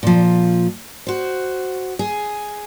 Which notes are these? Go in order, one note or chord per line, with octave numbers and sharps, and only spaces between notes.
A#2 F3
F#4 C5
G#4